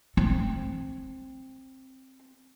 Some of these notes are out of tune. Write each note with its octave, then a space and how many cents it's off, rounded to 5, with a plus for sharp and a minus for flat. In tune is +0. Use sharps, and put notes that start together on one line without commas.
C4 +10